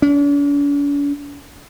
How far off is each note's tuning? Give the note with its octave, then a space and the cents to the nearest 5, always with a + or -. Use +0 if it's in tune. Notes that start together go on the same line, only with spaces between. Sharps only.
D4 -45